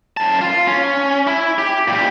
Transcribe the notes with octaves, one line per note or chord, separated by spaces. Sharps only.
F#2 A5
F4
C#4
E4
G4
A#2 G4